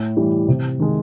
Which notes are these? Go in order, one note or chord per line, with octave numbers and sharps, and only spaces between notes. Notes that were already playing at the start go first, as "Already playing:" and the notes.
Already playing: A2
E3 G3
C3
D#3 G#3